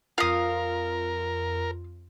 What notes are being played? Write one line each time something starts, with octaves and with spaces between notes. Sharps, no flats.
F2 F4 A#4 F5 D#6